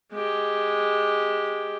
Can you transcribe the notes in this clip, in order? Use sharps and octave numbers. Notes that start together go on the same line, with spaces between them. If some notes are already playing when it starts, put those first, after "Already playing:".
G#3 G4